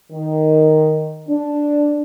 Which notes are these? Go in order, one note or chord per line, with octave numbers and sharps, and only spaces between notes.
D#3
D4